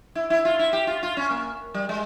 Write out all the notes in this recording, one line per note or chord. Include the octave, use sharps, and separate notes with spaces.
E4
E4
F4
E4
G4
F4
F4
C#4
A#3
G3
G#3